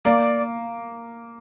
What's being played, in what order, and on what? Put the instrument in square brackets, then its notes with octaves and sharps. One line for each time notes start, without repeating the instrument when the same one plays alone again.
[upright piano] A#3 [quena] D5